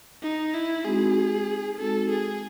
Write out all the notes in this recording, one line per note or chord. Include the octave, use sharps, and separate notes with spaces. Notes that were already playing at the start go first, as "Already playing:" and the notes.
D#4
E4
G#3 C4 D#4 F#4 G#4
G#3 C4 D#4 F#4 A4
G#4